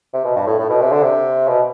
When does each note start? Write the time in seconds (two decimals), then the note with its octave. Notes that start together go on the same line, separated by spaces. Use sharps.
0.14 C3
0.25 B2
0.36 G2
0.47 A2
0.59 A2
0.70 B2
0.82 C3
0.92 D3
1.03 C3
1.48 B2